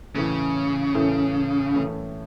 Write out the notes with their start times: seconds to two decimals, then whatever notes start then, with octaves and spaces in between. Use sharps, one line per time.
0.15 A2 C#3 E3 A3 C#4
0.95 A2 E3 A3 C#4
1.74 A2 E3 A3 C#4